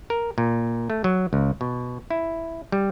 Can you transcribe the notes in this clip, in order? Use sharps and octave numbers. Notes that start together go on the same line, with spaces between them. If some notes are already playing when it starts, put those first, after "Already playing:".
A#4
A#2
A3
F#3
C#2
B2
E4
G3